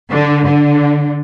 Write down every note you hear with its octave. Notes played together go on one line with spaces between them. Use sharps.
D3
D3